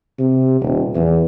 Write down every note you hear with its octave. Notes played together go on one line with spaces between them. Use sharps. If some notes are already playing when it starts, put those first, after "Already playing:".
C3
D#1
E2